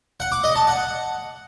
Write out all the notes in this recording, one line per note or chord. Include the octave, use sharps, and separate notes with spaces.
F#5
D6
D#5
A5
F#5